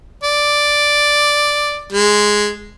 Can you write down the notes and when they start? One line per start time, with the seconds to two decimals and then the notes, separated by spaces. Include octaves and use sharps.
0.24 D5
1.93 G#3